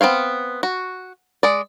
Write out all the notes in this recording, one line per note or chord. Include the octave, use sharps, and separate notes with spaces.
B3 C4 C#5 F5
F#4
G#3 D5